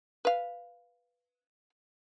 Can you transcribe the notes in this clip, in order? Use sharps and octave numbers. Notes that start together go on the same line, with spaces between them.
B4 F5